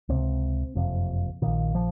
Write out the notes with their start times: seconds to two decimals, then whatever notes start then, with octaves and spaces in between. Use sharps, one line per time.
0.09 C#2 C3 C4
0.75 F#1 F2 C3
1.42 A#1 A#2 D#3
1.75 F3